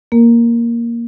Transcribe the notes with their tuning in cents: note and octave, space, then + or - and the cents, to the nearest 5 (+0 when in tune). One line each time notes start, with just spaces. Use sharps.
A#3 +5 A#4 +0